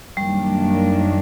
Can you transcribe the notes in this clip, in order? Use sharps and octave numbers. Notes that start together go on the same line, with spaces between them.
F#2 D#3 F#3 G3 A#3 D4